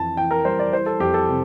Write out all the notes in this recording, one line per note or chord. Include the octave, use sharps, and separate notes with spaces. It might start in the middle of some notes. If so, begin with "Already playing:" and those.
Already playing: F2 E3 A5
E3 G5
A#4
G3 C5
D5
E3 C5
A4
F2 G4
A4
C3